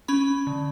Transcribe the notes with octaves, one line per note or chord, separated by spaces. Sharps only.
C#4 B5
D3